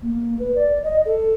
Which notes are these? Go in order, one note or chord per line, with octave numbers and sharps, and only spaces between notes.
A#3
B4
D5
D#5
A4